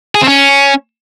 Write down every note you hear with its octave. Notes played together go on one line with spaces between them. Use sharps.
G#4
C4
C#4